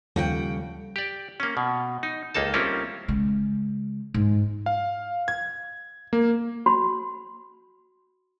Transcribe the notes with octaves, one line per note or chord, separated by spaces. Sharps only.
D#2 C#3 F3 G3 A4 F#5 G5
G4 D5
A#3 C#4
B2
D#4
C#2 A#3 D#4 A4 A5
G3 A#3 C4 C#4 E4 F4
C#3 G#3
G#2
F5
G#6
A#3
F#4 B5 C6